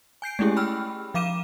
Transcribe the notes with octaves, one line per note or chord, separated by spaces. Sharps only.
G#5 G6 C7 D7
G#3 A3 C#4 E4 G4 G#4
G5 B5 E6 F6
F3 F5 D6 D#7 E7